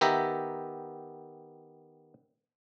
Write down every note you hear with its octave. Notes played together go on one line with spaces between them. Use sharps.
D#3 B3 G4 E5 A#5